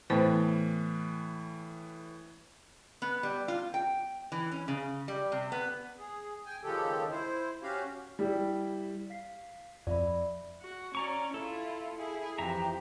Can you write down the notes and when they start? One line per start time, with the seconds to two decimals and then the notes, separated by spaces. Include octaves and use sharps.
0.10 A2 E3 B3 C5 G5
3.02 B3
3.23 G3
3.48 F4
3.74 G5
4.32 E3
4.52 C#4
4.68 C#3
5.08 G3
5.32 C3
5.52 B3
5.99 G#4
6.46 G5 G#5
6.64 D#2 C#3 F3 G#3 G4 A4
7.11 E4 C5
7.63 C#4 F#4 G4 F5
8.19 G3 E4 G4
9.10 F5 B6 C7
9.87 F2 D5 E5 B5
10.61 F#4
10.95 C#4 D5 A#5 C#6
11.34 E4 F4 A4
11.96 E4 G#4
12.38 F2 E3 G4 E5 A#5